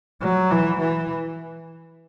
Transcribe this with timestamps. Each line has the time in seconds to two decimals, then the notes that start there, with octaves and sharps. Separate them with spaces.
0.22 F#3
0.51 E3
0.80 E3